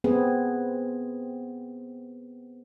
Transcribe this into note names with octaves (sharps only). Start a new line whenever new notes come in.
B3 C4 G#4